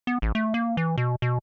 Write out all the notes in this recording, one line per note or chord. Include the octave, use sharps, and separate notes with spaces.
B3
A1
A3
A#3
E3
B2
B2